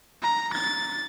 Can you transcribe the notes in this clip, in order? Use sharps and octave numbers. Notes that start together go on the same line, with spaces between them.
A#5
A6